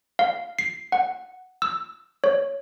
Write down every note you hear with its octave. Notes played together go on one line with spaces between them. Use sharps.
F5
C7
F#5
E6
C#5